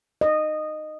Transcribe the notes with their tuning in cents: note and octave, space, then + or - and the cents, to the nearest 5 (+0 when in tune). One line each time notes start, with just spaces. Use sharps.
D#5 -15